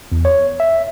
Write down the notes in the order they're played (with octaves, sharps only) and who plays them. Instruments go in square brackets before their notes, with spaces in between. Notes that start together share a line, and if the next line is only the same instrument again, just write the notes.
[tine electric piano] E2
C#5
E5